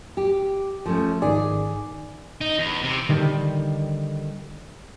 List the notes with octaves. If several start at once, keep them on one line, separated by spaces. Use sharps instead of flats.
G4
F3 A3 C#4
G#1 D#3 G#4 D5
D#4
E2
C3
D3 D#3 G3